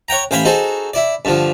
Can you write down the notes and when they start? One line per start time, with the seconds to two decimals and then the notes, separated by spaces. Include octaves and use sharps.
0.08 C#5 F#5 G5 A#5
0.31 A1 C5 F5 G5 G#5 B5
0.45 D#4 F#4 G#4 A4 C5
0.94 E4 D5
1.25 G2 D3 F3